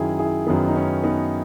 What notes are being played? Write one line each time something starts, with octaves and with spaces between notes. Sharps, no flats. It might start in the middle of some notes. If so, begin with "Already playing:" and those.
Already playing: F#2 D#3 E4 G#4
E4 G#4
F#2 D#3 B3
D#4
C#4
B3 D#4